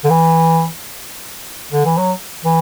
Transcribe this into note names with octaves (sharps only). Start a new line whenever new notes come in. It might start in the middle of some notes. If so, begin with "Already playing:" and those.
D3
E3
D3
E3
F#3
E3